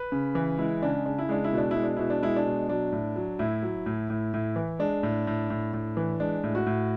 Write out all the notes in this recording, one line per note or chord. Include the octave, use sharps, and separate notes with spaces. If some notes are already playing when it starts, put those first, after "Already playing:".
Already playing: B4
C#3
E3
G#3 E4
C#3 D4
C#3 D4
E4
G#3 D4
E4
B2 D4
E4
G#3
D4
B2 E4
D4
G#3 E4
D4
B2
F#3 D4
A2
F#3
A2 E4
F#3
A2
A2
A2
E3
G#3 D4
A2
A2
A2
A2
E3
G#3 D4
A2
F#4
A2